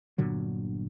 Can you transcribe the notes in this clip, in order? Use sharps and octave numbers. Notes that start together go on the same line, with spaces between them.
G1 A#2 D3 F#3